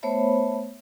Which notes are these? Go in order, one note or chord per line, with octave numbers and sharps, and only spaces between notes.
A3 B3 C5 C#5 E5 B5